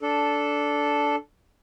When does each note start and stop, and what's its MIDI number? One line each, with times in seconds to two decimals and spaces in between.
0.01 1.16 62
0.01 1.16 69